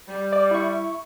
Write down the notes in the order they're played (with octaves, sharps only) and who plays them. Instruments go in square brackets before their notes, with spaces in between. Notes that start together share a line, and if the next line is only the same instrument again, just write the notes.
[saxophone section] G3
[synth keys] D5
E4 C#6